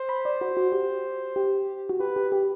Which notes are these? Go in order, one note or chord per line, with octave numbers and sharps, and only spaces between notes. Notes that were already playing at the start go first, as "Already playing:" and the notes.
Already playing: C5
B5
D5
F#4
F#4
G4
G4
F#4
G4 B4
G4
G4